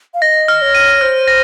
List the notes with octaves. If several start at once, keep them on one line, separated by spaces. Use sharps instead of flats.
F5
D#5 A#6
F6
C#5
D#7
C5 F6
A#6